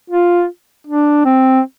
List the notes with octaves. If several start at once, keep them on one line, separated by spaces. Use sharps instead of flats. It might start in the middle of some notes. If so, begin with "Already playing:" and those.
F4
D4
C4